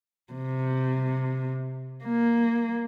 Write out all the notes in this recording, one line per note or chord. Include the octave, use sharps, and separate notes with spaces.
C3
A#3